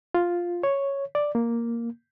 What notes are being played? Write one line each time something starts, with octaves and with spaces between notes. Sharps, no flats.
F4
C#5
D5
A#3